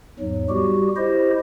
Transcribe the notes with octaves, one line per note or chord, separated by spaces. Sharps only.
E2 G#2 F#3
G3 F#4 G4
E4 G4 C5 D#5